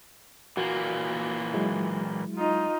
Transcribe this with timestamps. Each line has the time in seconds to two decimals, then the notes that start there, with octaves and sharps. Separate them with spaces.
0.57 A#2 E3 A#3 F#4
1.54 F#3 G#3 E4
2.35 D#4 F4